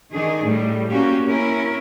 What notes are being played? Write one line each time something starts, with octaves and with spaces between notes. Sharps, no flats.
D#3 D4 G#4
A2 G3
A#3 C#4 F#4 G4
C#4 E4 A#4